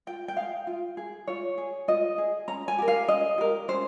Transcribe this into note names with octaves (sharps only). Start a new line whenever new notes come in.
F4 G5
G5
G#4 F5
F4
G#4
F4 C#5
G#4
F4 D#5
G#4
C#4 A#5
G#5
G4 A#4
F5
C#4 D#5
G4 A#4
C#4 C5